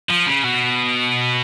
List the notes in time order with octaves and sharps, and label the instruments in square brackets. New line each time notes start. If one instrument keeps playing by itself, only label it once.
[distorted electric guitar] F3
C#3
B2